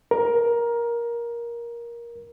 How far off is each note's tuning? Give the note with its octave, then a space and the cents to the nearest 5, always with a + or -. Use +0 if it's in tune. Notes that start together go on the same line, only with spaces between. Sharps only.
A#4 +15